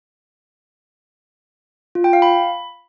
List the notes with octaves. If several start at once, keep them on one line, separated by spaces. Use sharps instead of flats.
F4
G5
F5
B5